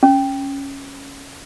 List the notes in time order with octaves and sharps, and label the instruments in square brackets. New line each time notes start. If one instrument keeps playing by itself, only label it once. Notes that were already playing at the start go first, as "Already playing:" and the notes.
[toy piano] C#4